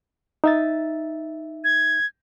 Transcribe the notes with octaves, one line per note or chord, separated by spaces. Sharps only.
D#4 E5 A6
G#6